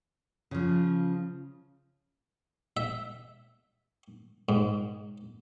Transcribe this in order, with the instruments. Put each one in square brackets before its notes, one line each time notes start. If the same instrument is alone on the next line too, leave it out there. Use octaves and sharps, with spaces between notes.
[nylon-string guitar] C#3 F3
[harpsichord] E5
G#2